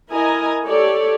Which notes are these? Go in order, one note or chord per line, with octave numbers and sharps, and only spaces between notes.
E4 A#4 D#5 G#5 A#5
G4 A4 C#5 D5